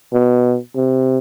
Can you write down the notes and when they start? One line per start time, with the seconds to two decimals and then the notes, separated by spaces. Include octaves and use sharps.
0.13 B2
0.76 C3